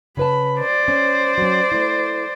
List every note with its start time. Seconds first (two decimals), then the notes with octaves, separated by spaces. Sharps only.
0.17 C#3 B4 A5 B5
0.58 C5 D5
0.88 C#4
1.38 F#3 C#4
1.72 A3 E4